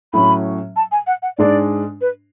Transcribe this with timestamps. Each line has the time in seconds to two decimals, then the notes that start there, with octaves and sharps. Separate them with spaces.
0.13 A2 F#3 C#4 B5
0.76 A5
0.92 G#5
1.07 F#5
1.22 F#5
1.38 G#2 G#3 D4 D5
2.01 B4